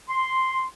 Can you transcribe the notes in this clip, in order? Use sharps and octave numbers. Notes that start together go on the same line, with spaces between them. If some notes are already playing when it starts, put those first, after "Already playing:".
C6